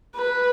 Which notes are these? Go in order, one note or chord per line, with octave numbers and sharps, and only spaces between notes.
B4